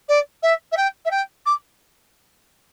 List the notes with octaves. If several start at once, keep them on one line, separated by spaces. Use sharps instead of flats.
D5
E5
E5
G5
E5
G5
D6